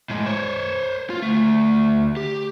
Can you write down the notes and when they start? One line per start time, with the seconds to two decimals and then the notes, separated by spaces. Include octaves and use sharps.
0.10 A2 G#3
0.26 C5 C#5
1.10 F4
1.22 D2 A3
2.17 G4